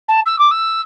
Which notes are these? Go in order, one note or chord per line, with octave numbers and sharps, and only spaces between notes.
A5
E6
D6
E6